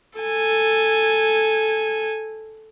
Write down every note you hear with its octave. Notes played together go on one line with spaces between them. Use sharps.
A4 G#5